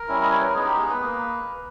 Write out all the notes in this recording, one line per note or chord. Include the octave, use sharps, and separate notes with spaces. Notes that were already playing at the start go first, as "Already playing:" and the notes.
Already playing: A#4
G3 C#4 E4
D#5
C#5
B4
A#4
G#3 B3 D#4 G#4
G4
G#4
B4
A#3